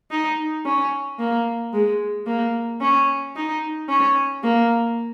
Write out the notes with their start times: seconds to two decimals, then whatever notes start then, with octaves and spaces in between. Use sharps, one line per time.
0.11 D#4
0.65 C#4
1.19 A#3
1.73 G#3
2.27 A#3
2.81 C#4
3.36 D#4
3.89 C#4
4.44 A#3